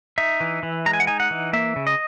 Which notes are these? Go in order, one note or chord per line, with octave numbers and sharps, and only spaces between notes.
D#4 E5
E3
E3
G#3 A#5
G#5
F#5
D#4 G#5
F#5
E3
A#3 E5
C#3
D#5